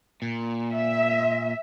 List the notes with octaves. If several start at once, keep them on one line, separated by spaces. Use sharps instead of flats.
A#2
E5